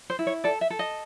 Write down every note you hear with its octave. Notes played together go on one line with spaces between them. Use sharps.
C5
E4
C#5
A4 D5
E5
A4
D#5